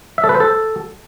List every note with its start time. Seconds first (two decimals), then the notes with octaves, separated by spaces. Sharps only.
0.18 E5
0.24 A4
0.29 B4
0.35 C5
0.40 A4